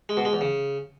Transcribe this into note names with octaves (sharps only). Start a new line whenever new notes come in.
G#3
B2
G#3
E2
C#3